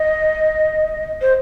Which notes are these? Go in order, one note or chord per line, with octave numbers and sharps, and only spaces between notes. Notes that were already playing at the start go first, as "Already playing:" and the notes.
Already playing: D#5
C5